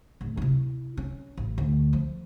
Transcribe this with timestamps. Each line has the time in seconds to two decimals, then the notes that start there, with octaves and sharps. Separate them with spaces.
0.21 D1
0.37 C3 E4
0.97 C#4
1.37 A1
1.58 D2
1.93 F3